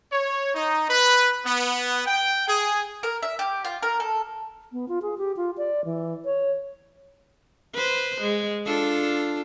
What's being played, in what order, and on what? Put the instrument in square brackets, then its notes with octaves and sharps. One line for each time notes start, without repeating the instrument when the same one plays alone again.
[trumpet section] C#5
D#4
B4
B3
G5
G#4
[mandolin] A#4
E5
G4
F4
A#4
A4
[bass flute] B3
F4
G#4
G4
F4
D5
E3
C#5
[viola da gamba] B4 C5
G#3
D4 F4 A4